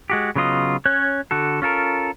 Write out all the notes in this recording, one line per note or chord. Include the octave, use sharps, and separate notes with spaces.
G#3 F#4 G4
C#3 F#3 B3 F4 D#5
C#4 C#5 F#6
D3 F#4 A4
C#4 F4 A4 A#4